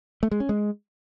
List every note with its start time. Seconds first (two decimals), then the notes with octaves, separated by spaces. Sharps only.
0.23 A3
0.31 G#3
0.40 C#4
0.49 G#3